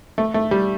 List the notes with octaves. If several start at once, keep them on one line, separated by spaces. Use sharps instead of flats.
A3
A3
G3